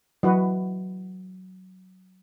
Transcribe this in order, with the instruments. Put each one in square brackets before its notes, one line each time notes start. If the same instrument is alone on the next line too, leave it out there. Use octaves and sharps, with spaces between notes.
[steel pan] E3 F#4 B4 [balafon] F#3